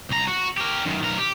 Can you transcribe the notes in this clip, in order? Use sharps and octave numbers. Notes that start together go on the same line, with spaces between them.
C2 A#5
F#4
G4 A#4
F#2 D#3
B1 A#4
G4